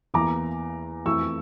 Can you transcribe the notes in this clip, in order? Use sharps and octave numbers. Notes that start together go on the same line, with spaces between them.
E2 E3 A#3 E4 A#5 D6
F2 E3 A3 E4 C#6 E6